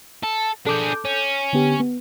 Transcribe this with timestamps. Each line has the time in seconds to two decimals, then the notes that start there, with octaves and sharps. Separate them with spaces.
0.23 A4
0.66 D4 G#4 A4 D6 G6
1.05 C#4
1.53 D3 B3 G4
1.80 B3